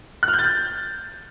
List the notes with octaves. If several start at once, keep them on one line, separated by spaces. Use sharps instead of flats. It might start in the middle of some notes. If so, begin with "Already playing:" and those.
F#6
F6
G6
A6
G6